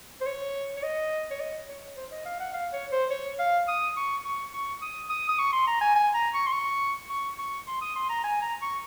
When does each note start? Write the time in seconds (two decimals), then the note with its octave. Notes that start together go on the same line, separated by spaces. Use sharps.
0.21 C5
0.26 C#5
0.77 C#5
0.83 D#5
1.31 C#5
1.40 D#5
1.68 C#5
1.96 C5
2.11 D#5
2.25 F5
2.40 F#5
2.54 F5
2.73 C#5
2.92 C5
3.11 C#5
3.39 F5
3.68 D#6
3.96 C#6
4.25 C#6
4.53 C#6
4.82 D#6
5.10 D#6
5.29 D#6
5.39 C#6
5.52 C6
5.67 A#5
5.81 G#5
5.95 G#5
6.14 A#5
6.34 C#6
6.47 C6
6.52 C#6
7.09 C#6
7.39 C#6
7.67 C6
7.81 D#6
7.96 C6
8.09 A#5
8.24 G#5
8.42 A#5
8.62 C#6